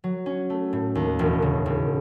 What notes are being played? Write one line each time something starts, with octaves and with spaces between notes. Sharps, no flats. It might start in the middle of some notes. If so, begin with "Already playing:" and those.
F#3
C#4
A3
A2
D#2
E1
C#3
E1